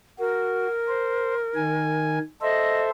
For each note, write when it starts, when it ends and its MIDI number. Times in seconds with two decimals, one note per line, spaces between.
0.19 0.67 66
0.19 2.19 70
0.88 1.34 72
1.55 2.19 51
1.55 2.19 80
2.42 2.90 69
2.42 2.90 72
2.42 2.82 75
2.42 2.90 76